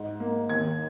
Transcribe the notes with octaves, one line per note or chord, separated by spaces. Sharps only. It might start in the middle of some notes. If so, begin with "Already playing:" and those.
Already playing: G#2
A#3
D#2 G#6